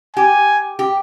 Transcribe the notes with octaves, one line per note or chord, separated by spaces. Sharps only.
G4 G#5
G4